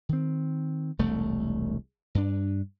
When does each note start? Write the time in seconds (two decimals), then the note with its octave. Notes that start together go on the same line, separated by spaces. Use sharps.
0.09 D#3 C4
0.99 E1 C2 A3
2.15 G2 D4